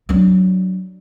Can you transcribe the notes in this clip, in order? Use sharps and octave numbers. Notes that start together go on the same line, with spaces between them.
F#3 D4